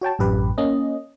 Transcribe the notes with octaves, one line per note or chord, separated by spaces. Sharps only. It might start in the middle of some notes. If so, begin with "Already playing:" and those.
F#4 C#5 G5 A5
A1 F#2 G4 B4
A#3 C#4 D#5